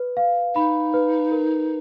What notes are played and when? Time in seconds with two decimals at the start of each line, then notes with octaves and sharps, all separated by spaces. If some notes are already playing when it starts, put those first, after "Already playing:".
Already playing: B4
0.17 F5
0.55 D#4 B5
0.94 B4
1.32 A#4